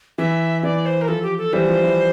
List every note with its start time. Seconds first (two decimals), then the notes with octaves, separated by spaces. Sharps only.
0.18 E3 E5
0.63 E3 D5
0.86 C5
1.01 A#4
1.08 F3 A4
1.23 G4
1.38 A4
1.53 E3 G3 C5
1.68 F3
1.83 E3